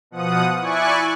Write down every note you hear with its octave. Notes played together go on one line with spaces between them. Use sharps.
B2 F3 F#5 D#6
E4 D5 G#5 C#6 F#6